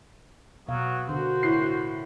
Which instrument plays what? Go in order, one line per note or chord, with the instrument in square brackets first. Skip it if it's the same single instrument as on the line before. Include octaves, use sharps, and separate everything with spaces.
[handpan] B2 F5 [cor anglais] F#3 [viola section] B3
[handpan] D3 [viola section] F#4 A#4 [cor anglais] C5
[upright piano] A2 C7